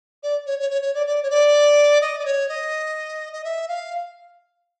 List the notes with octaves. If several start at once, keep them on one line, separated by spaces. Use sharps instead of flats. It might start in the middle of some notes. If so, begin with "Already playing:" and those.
D5
C#5
C#5
C#5
C#5
D5
D5
C#5
D5
D#5
D5
C#5
D#5
D#5
E5
F5